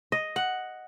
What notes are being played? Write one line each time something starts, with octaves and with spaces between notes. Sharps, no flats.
D#5
F#5